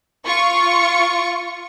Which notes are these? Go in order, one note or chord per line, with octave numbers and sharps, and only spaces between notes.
F4 C#6 C#7